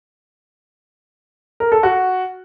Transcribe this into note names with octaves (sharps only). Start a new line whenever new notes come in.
A#4
A4
F#4